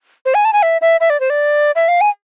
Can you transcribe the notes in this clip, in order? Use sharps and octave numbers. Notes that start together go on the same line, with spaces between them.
C5
G#5
A5
G#5
E5
E5
E5
D5
C5
D5
E5
F5
G#5